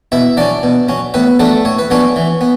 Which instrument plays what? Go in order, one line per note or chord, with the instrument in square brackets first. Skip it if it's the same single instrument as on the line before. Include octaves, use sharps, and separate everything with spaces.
[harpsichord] B2 E4 E5
F#3 C#4 D4 D5
B2
F#3 C#4
A2 B3 B4
F#3 A3 B3 D4 A4
A2 C#5
B4
F#3 B3 C#4 D4 C#5
E3
B3